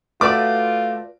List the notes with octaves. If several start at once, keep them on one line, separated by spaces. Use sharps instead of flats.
A3 F4 F#4 B4 D5 D6